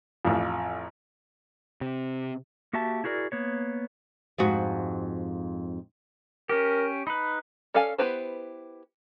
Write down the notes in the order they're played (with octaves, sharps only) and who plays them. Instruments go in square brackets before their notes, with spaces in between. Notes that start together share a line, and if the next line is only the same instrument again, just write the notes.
[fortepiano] A1 F2
[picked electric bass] C3
[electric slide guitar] A#3 F#4 G4 E5 A5
E4 F#4 G#4 A#4 D5
A#3 B3 C#5
[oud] F2 G#2 F#4
[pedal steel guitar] C#4 G4 [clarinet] A#4
[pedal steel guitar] D#4 B4 [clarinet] B5
[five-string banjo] C#4 A4 D5 F5 G#5
B3 E4 G4 B4 C5